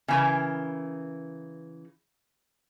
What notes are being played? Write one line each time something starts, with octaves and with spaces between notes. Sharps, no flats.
C#3 E3 A#4